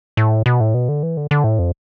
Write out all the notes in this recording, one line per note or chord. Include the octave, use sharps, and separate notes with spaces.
A2
B2
A2
B2
D3
E3
D3
D3
A2
F2